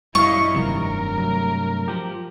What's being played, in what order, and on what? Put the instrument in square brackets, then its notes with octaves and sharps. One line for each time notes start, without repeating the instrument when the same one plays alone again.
[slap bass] F#2 A#2 [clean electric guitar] G3 F5 [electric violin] E4 D#5 [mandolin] C#6
[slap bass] F1 D#3 F#3 [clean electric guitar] G2 C3 [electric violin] A#4
[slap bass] F#3 A3
[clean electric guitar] F3 G4